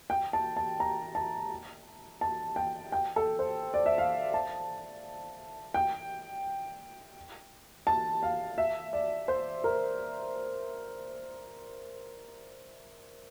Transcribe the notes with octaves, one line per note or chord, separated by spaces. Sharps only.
G5
A5
A5
A#5
A5
A5
G5
G5
A4
C5
D5
E5
F5
A5
G5
A5
F5
E5
D5
C5
A#4